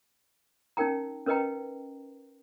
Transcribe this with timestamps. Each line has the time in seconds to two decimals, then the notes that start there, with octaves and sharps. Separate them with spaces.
0.77 C#4 D#4 A#4 G5 A#5
1.26 C#4 A#4 B4 D#5 G5 A#5